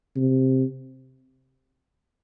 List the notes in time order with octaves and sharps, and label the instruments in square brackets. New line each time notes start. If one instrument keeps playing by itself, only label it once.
[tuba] C3